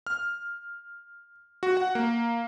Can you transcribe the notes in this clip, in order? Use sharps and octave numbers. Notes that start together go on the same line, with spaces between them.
F6
F#4
F#5
A#3